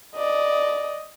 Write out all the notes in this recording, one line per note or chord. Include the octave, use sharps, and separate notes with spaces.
D5 D#5